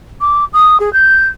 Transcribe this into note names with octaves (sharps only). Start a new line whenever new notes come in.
D6
D#6
G#4
G6